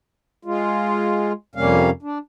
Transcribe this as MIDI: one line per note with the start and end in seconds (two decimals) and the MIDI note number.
0.45 1.33 56
0.45 1.33 65
1.55 1.90 41
1.55 1.90 48
1.55 1.90 55
1.55 1.90 58
1.55 1.90 61
1.55 1.90 77
2.02 2.18 62